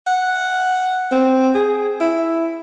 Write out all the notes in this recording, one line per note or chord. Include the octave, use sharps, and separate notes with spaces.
F#5
C4
G#4
E4